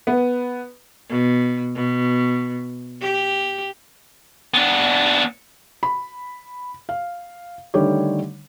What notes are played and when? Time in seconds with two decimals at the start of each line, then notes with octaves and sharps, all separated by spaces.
0.07 B3
1.09 B2
1.75 B2
3.01 G4
4.54 B3 D4
5.83 B5
6.89 F5
7.74 D3 D#3 G3 A3 G4 C#5